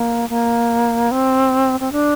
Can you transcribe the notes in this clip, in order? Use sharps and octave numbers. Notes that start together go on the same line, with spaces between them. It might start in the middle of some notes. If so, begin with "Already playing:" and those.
Already playing: A#3
A#3
C4
C4
D4